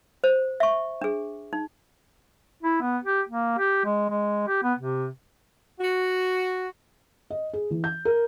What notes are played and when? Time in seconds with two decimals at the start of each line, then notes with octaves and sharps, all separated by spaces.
0.24 C5
0.60 E5 C#6
1.01 D4 G#4
1.53 D#4
2.63 E4
2.82 B3
3.04 G4
3.29 A#3
3.58 G4
3.85 G#3
4.10 G#3
4.47 G4
4.63 B3
4.79 C3
5.80 F#4
7.30 D#5
7.53 G#4
7.70 E3
7.84 G6
8.05 A#4